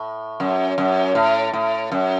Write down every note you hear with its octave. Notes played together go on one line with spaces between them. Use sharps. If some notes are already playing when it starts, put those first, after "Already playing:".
Already playing: A2
F#2
F#2
A2
A2
F#2